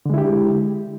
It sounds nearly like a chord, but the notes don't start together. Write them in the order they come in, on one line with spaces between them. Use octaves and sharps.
D3 G#3 E4 G4